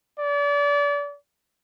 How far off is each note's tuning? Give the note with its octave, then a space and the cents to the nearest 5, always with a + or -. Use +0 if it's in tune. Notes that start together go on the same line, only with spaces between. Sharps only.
D5 -35